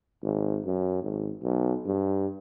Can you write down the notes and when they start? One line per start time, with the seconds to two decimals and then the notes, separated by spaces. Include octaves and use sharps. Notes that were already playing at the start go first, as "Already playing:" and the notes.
0.22 G#1
0.66 F#2
1.02 G#1
1.43 B1
1.86 G2